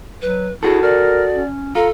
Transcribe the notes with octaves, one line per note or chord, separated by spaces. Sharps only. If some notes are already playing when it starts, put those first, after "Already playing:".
F#3 B4
E4 F#4 G#4 A4
A#4 D5
C#4
F4 A4 A#5